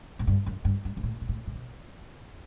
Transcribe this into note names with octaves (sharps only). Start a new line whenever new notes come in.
A2
G2
F#2
G2
G2
B2
A2
B2
A2
A2
B2